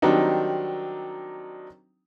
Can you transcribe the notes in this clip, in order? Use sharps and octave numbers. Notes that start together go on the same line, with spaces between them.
D#3 F#3 G3 C4 D4 D#4